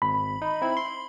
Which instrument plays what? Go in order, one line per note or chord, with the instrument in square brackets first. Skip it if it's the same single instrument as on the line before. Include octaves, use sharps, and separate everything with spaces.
[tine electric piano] G#1 [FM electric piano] B5
[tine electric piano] D#4
C4 E4
C6